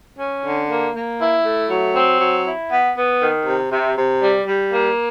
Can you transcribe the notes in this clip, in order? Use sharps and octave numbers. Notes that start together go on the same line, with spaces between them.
C#4
D3
A#3
A#3
E4
A3
F#3
C4
F#3
E4
B3
B3
D#3
C3
C3
C3
G3
G3
A#3